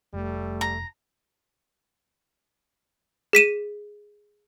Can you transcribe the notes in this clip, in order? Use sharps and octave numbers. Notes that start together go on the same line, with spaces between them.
F1 G3 A3
A#5
G#4 B6 D#7 E7